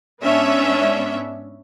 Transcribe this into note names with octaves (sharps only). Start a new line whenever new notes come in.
G#2 B3 C#4 D4 E5